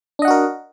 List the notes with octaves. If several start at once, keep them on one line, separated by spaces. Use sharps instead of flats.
D4 F#4 A#4 D#5 F#5